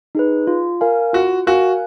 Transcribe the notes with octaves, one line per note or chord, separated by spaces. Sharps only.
D#4 G#4 B4
F4
A#4 F5 G#5
F4 F#4
F#4 A#4 F5 G#5